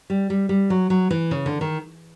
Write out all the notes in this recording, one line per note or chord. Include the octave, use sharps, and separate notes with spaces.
G3
G3
G3
F#3
F#3
E3
C#3
D3
D#3